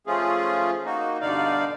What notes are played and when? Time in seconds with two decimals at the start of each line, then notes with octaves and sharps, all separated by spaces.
0.07 F3 A3 C#4 F4 G#4
0.85 A#3 D#4 F#4
1.21 G2 B2 D3 D#4 D5 F5